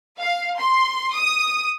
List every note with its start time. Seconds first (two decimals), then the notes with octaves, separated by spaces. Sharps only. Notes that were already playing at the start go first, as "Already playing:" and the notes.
0.20 F5
0.58 C6
1.14 D#6